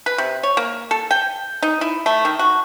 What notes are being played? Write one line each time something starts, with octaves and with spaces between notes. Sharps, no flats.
B4
C3
C#5
A#3
A4
G5
D#4
E4
A3
D#3
F#4